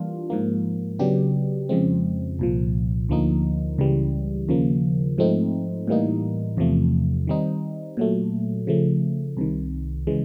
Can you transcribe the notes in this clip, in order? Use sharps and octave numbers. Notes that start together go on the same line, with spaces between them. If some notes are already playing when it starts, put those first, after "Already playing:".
Already playing: E3 G3 A#3 D4 F4
G#2 F3 A#3
C#3 F#3 B3 D4 G4
F2 C#3 F3 G#3 C4
C2 A#2 F3
D2 D3 F3 A#3 D#4
C#2 C#3 E3 G3
D#2 C#3 F3 A#3
G#2 F3 A3 C4 D#4
A2 E3 G3 A#3 D#4
E2 C3 F3 A3
D#3 G3 C4 D#4
A#2 F#3 A3
C#3 F3 A3
C2 C3 D#3
C#3 E3 G#3